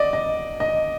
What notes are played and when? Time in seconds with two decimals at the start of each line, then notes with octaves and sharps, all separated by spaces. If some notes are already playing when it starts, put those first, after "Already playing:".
Already playing: D5 D#5
0.13 D#5
0.60 D#5